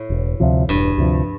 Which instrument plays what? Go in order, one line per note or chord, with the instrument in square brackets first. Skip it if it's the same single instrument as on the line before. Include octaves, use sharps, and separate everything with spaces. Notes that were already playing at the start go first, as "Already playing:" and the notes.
Already playing: [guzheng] A2
[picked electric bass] E1
D2 C3 F3
[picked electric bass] E1 [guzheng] G2
[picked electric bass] D2 C3 F3